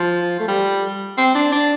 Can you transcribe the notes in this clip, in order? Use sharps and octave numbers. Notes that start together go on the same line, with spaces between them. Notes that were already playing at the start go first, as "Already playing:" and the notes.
Already playing: F3
A3
G3
C4
D4
D4